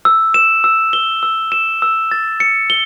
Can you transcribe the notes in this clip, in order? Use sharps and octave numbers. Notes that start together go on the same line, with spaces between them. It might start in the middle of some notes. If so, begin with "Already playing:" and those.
E6
E7
E6
G7
E6
E7
E6
A6
C#7
G7